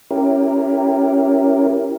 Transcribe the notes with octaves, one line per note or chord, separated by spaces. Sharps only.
C#4 E4 G4 A#4